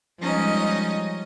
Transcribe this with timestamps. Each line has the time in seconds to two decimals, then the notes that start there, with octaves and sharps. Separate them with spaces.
0.19 F3 G3 G#3 C#4 D#4 D#5